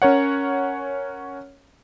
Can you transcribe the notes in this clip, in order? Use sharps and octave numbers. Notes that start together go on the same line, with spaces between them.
C#4 A#4 C#5 F#5